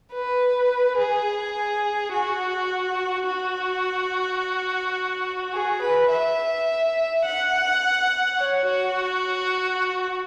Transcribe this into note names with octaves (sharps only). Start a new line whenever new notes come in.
B4
G#4
F#4
F#4
G#4
B4
E5
F#5
C#5
F#4